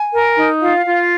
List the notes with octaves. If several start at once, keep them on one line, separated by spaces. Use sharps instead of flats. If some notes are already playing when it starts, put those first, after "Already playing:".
Already playing: G#5
A#4
D#4
F4 F5
F4